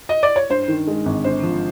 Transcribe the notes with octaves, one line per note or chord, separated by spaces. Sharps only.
D#5
D5
C#5
G2 C5
D#3
G#3
G#1
D3 C5
F3